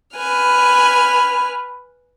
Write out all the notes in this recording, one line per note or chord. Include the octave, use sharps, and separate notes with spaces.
B4 G#5 B5 F6